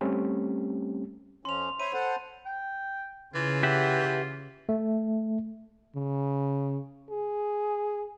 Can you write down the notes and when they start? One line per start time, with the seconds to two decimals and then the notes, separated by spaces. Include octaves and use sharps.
0.01 G3 A3 C4 C#4 G4
1.45 F2 F3 C#4 C6 F7
1.80 C5 C#5 E5 B5 D#7
1.93 A4 C5 F#5
2.46 G5
3.35 C#3 E3 F4
3.63 G4 E5 F#5
4.69 A3
5.96 C#3
7.10 G#4